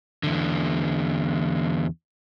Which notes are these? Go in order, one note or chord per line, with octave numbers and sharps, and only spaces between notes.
E2 D3